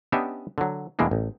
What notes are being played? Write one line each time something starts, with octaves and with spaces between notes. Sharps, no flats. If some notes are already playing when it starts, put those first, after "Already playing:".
B3 C#4 D4 G4 D#5 E5
D3 F#3
E2 B2 E3 G#3 A#3 D4
A1